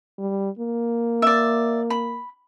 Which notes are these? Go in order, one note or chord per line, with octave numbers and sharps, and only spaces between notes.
G3
A#3
D5 E5
B5